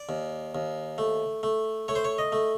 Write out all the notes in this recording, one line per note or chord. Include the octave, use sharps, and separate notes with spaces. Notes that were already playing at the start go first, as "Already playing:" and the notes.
Already playing: D5
D#2
D#2
A3
A3
A3 C#5
C5
C#5
D#5
A3